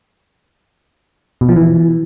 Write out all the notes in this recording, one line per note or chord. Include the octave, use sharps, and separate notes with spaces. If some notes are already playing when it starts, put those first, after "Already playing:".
B2
F3
E3